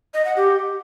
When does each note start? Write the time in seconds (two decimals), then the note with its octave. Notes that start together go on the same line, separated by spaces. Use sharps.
0.14 D#5
0.25 F#5
0.37 G4